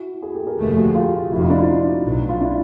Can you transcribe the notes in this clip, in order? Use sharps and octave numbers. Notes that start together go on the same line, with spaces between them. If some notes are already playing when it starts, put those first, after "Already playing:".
Already playing: E4 F#4
F#4 G#4
G4 A4
G#4 A#4
F1 D#2 D3 F3 A3 G4 A4
F#4 G#4
F4 G4
F1 F2 C3 E4 F#4
D#4 F4
D4 E4
D#4 F4
B1 A2 F#3
F4
D4 E4